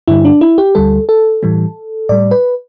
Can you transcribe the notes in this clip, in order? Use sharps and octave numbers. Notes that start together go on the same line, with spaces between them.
G2 D3 G3 E4
D4
E4
G4
D2 D3 G3 A4
A4
A2 E3 G3
A2 G3 D5
B4